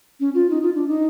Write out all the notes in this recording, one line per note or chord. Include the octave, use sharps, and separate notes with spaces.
C#4
F4
D#4
F4
D4
D#4